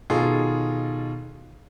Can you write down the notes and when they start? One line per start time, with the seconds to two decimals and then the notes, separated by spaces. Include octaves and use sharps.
0.10 B2 D#3 F4 G#4 A4